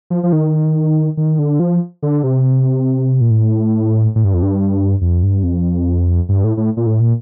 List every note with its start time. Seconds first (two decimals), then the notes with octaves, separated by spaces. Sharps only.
0.10 F3
0.23 F3
0.33 D#3
1.17 D#3
1.39 D3
1.60 F3
2.03 D3
2.24 C3
3.21 A#2
3.30 A2
4.16 A2
4.24 G2
4.34 F2
4.43 G2
5.01 F2
5.23 G2
5.43 F2
6.29 G2
6.44 A2
6.57 A2
6.77 A#2
6.86 A2
7.00 A#2